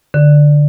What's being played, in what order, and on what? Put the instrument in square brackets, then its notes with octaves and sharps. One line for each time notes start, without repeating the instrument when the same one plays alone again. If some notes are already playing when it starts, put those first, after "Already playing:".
[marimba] D3